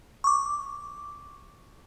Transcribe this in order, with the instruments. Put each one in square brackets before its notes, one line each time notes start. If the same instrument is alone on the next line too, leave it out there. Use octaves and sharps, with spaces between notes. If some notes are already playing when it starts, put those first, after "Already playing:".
[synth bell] C#6 D6